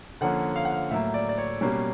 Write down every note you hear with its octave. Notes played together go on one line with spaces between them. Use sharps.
D3 F3 A#3 C#4 F#5
F5
F#5
F5
A2 F#3 A#3 E5
D5
D5
C#5
B2 G3 A#3 C#4